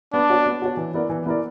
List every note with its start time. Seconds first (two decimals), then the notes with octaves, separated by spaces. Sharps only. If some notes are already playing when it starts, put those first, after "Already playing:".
0.13 B3 D4
0.30 F#4 C#5
0.46 B3
0.62 F#4 C#5
0.77 E3
0.94 B3 E4 A#4 D5
1.09 E3
1.26 B3 E4 A#4 D5